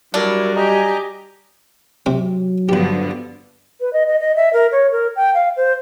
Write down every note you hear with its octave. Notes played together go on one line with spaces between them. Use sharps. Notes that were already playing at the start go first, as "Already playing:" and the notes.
F#3 G3 D4 E4 A#4
G4 D#5 G#5 A#5
C3 F#3 C4 D6
G2 D3 F3 B3 G4 B4
B4
D#5
D#5
D#5
E5
A#4
C#5
A#4
G5
F5
C5